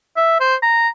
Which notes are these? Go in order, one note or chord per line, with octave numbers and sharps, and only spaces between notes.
E5
C5
A#5